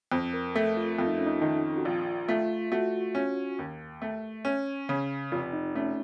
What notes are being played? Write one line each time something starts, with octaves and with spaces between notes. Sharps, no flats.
F2 C5
A#4
A3 A4
F4
F2 F4
D#4
C#4
D#4
D#3 D#4
F#4
A#1 F4
A3 F4
A3 F#4
C#4
D#2
A3
C#4
C#3
F1 F4
D#4
A3 C#4